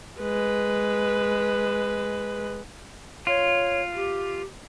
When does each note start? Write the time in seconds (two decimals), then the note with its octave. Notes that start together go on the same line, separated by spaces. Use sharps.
0.20 G#3 B4
3.27 F4 C#5
3.94 G4